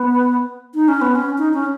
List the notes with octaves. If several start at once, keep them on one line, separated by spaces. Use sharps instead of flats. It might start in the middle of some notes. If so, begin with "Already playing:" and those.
Already playing: B3
D#4
C#4
B3
C#4
D#4
C#4